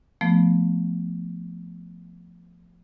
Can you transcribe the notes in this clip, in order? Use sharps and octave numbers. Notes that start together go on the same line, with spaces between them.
F3 A3 B3